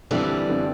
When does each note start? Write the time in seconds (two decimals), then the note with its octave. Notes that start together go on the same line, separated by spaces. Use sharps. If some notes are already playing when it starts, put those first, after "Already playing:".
0.11 D3 E3 F3 G3 C4
0.49 D3 F3 C4